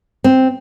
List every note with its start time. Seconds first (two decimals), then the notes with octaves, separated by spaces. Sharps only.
0.24 C4